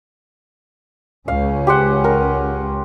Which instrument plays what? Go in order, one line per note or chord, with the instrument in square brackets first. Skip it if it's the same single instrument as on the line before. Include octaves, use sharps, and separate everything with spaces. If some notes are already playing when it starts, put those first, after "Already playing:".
[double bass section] C#2 C#4 [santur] F5
[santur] G4 C5 F#5
A#4